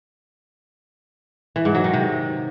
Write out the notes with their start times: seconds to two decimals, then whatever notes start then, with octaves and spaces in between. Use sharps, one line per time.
1.56 E3
1.65 G#2
1.75 F#3
1.84 D#3
1.94 C3